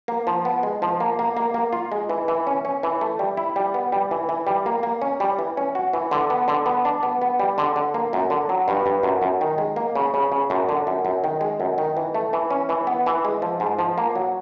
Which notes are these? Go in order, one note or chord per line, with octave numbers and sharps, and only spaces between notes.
A#3
F3
B3
G#3
F3
A#3
A#3
A#3
A#3
F4
G#3
E3
E3
C#4
C#4
E3
A3
G3
E4
G3
B3
G3
E3
E3
G3
A#3
A#3
C#4
G3
E3
C#4
F#4
E3
D3
B3
D3
B3
D4
B3
B3
G3
D3
D3
A#3
F#2
D3
F#3
G2
G2
F#2
F#2
D#3
G#3
A#3
C#3
C#3
C#3
F#2
D3
F#2
F#2
D#3
G#3
F#2
D#3
E3
A3
E3
C#4
E3
B3
E3
G#3
F3
G#2
F3
A#3
F#3